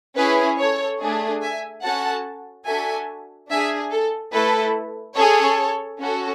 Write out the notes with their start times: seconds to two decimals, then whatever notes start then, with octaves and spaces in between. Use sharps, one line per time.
0.17 C#4 E4 G#4 B4
0.58 A4 C#5
1.00 A3 D4 G#4
1.42 E5 G#5
1.83 C#4 F#4 A4 F#5 A5
2.66 D4 F#4 A4 E5 G#5
3.49 D4 G#4 E5 G#5
3.91 A4
4.33 A3 E4 A4 B4
5.16 C#4 G#4 A4 C#5
5.99 C#4 F#4 A4